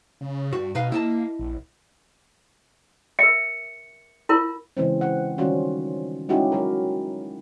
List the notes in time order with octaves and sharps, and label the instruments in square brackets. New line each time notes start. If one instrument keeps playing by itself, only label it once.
[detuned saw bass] C#3
[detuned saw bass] G2 [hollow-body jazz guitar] F#4
[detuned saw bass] B2 [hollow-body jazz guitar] D#4 B4 F5
[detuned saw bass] A#3 [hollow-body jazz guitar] E4 D#5 A5
[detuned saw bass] A#1
[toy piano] A#4 E5 [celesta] C#7
[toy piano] E4 F4 A#4
[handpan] C#3 E3 G#3 C4
F#5
D#3 G3 C#4 F4 F#4
G#3 C#4 D#4 E4 F#4 G4
F#3 A#4